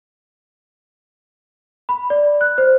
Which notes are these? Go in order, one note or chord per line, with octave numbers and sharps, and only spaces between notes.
B5
D5
F#6
C5